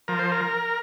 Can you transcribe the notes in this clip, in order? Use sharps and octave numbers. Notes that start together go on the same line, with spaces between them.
F3 A#4
C5
A#4